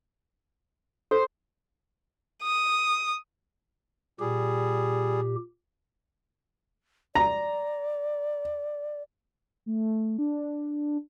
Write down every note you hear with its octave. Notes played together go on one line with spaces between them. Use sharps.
A4 C5
D#6
A#2 G3 G4 G#4
D5 A#5
A3
D4